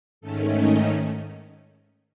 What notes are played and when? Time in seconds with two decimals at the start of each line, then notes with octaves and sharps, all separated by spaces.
0.21 G#2 D#3 A3 C#4 A4
0.57 D#5